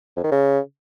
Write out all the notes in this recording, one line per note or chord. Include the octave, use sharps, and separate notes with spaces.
F2
D#3
C#3